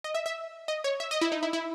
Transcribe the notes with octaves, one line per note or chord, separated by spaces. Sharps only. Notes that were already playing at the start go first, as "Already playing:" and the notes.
D#5
E5
E5
D#5
C#5
E5
D#5
E4
D#4
E4
E4